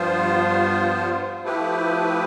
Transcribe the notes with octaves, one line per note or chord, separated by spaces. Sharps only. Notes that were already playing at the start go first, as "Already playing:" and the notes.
Already playing: G2 F3 B3 F4 C5
F3 A3 E4 G4 B4